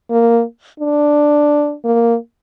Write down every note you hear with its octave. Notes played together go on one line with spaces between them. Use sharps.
A#3
D4
A#3